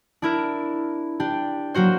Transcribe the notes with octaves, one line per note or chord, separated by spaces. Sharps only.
D4 E4 A#4
D4 G4
F#3 A#3 F#4 C5